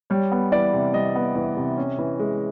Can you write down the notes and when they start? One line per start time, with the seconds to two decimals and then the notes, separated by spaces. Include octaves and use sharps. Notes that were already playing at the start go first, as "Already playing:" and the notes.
0.10 G3 C#5
0.31 B3
0.52 E3 D5
0.73 C3
0.94 G3 D#5
1.15 B3
1.35 E3
1.57 C3
1.77 C#4
1.98 E3
2.19 G#3